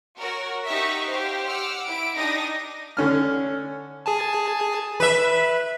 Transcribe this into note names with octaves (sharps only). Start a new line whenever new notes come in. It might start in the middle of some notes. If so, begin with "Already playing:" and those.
F#4 A#4 C#5
D#4 G4 E5 F#5 C#6 B6
G4 C5 F5
F#5 D6 E6 F6
E4 D7
D4 D#4 G4 D#6 A#6
D3 C#4 F6
G#4 G#5 A5
B4 E5